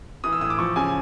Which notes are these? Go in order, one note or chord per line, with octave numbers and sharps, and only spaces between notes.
E3 D#6
E6
A2 D#6
D6
F3 C#6
C#3 G#5